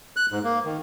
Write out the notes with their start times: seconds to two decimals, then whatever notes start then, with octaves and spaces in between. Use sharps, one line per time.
0.16 F#6
0.32 G#2
0.43 A#3
0.65 D#3